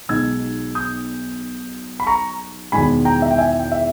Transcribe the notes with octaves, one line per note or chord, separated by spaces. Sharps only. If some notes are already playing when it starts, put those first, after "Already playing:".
B1 B2 G#3 D#4 E6 G#6
D#6 G6
B5
A#5 C#6
E1 E2 D#3 G#3 G#5 B5
G5 A#5
E5
G5
E5 G#5
G5
E5